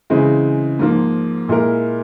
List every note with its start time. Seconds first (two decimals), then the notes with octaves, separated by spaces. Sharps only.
0.10 C#3 E3 G#3 C4
0.79 G#2 F3 A#3
1.49 A#2 G#3 E4 A#4